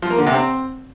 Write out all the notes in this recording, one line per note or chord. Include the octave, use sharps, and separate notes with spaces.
F3
A#3
D3
C3
C4